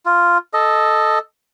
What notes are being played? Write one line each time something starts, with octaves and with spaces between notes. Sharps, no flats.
F4
A4 D#5